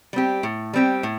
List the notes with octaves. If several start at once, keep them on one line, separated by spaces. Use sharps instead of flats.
G3 C4 G4
A2
G3 C4 G4
A2